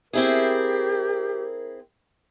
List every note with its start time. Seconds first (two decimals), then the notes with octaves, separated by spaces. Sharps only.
0.13 C4 E4 G4 G#4 A#4